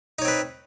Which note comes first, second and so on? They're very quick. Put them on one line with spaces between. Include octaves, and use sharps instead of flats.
D#4 C#5 C4 B4